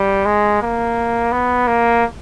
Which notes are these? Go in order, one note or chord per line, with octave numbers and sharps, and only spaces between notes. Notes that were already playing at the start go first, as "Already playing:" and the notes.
Already playing: G3
G#3
A#3
B3
A#3